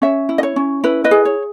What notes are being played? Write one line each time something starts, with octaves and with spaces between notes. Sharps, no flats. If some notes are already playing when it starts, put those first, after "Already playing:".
C#4 C#5 E5
E4
D#5
C#5
C#4
E4 B4
B4 D#5
G#4
C#5